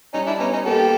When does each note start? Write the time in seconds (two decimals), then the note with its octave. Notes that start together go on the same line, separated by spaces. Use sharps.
0.13 G3 C#4 D#4
0.27 D4 E4
0.40 B3 C#4 D#4
0.53 C#4 D#4
0.65 A#3 G4 A4